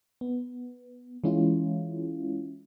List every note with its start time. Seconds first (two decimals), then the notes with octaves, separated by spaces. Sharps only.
0.21 B3
1.24 E3 G#3 C#4 E4 F4